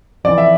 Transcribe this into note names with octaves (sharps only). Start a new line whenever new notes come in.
F2 E3 D5
E5